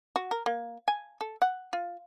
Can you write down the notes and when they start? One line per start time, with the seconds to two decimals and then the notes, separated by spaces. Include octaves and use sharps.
0.16 F#4
0.31 A#4
0.46 A#3
0.88 G#5
1.21 A4
1.42 F#5
1.73 F4